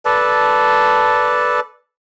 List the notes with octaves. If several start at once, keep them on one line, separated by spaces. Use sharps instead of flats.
A4 B4 D5 A5